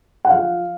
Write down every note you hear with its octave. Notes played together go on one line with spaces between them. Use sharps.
F#5
F3 F5